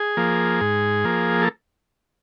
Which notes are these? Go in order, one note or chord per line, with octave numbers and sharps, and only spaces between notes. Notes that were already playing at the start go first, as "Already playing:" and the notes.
Already playing: G#4
F3 A#3
G#2
F3 A#3
A4